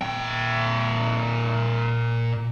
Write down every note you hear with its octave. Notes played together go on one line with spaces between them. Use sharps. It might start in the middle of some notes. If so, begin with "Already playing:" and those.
A#2 G5